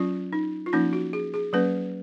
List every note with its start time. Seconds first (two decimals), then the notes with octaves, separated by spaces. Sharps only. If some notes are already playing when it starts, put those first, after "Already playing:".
Already playing: F#3 C#4 F4
0.33 D#4
0.66 F4
0.73 F3 A#3 C#4 D#4
0.93 F#4
1.13 G#4
1.34 G#4
1.53 F#3 A#3 C#4 B4